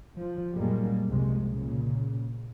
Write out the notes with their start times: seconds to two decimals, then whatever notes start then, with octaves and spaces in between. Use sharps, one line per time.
0.19 F3
0.56 F#2 A#2 G3 G#3 A#3
1.09 C2 F2 C3 G#3
1.49 A#2 C#3